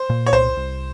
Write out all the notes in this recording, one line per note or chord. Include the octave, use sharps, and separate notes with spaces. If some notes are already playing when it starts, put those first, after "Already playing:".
Already playing: C5
A#2
C#5
C2 C5
C2